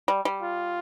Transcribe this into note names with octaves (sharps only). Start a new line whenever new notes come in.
G3
G3
F4